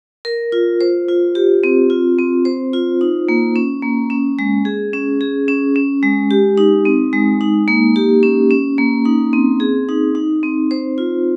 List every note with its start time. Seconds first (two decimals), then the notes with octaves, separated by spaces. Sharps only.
0.25 A#4
0.52 F4
0.81 C5
1.09 F4
1.35 G4
1.64 C4
1.90 F4
2.19 C4
2.45 C5
2.73 F4
3.01 D#4
3.29 A#3
3.56 C#4
3.82 A#3
4.10 C#4
4.39 G#3
4.65 G#4
4.93 C#4
5.21 G#4
5.48 C#4
5.76 C#4
6.03 G#3
6.31 G4
6.57 D#4
6.85 C4
7.13 G#3
7.41 D#4
7.68 A#3
7.96 G4
8.23 C#4
8.51 C#4
8.78 A#3
9.05 D#4
9.33 C4
9.60 G#4
9.89 D#4
10.15 D#4
10.43 C4
10.71 C5
10.98 F4